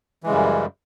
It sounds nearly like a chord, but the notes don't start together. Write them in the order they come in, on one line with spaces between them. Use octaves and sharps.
E3 G#3 C#3 G3 F#2